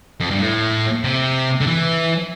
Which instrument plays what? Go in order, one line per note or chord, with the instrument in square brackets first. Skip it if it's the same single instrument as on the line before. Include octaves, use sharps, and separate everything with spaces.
[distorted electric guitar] F2
G2
A2
C3
D3
E3